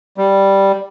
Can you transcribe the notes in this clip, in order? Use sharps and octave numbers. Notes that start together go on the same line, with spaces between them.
G3